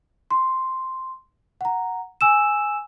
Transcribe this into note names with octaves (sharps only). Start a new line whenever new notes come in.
C6
F#5 A#5
G#5 E6 E7